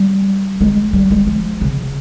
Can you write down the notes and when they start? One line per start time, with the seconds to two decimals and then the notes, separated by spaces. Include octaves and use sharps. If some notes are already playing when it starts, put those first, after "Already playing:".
Already playing: G3
0.61 G#3
0.93 G3
1.11 G#3
1.27 F3
1.61 C#3